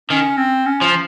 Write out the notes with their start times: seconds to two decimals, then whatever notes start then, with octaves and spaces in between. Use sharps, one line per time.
0.10 D#3 C#4
0.37 C4
0.66 C#4
0.82 F3